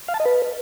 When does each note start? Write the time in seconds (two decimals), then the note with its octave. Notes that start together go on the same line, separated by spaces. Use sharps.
0.08 F5
0.14 A5
0.20 D#5
0.25 B4